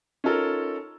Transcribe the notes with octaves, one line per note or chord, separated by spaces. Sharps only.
C#4 D#4 F4 A4 A#4